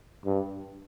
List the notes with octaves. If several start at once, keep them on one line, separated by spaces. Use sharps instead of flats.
G2